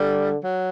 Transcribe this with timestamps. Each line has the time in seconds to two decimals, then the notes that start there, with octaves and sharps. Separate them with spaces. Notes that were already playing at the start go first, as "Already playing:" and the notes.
Already playing: D3 G3
0.44 F#3